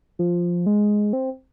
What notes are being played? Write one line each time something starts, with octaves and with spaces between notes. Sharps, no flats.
F3
G#3
C4